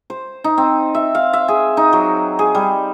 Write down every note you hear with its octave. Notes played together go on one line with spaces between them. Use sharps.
C5
D#4
C4
E5
F5
E5
G#4
D#4
F#3
G#4
G3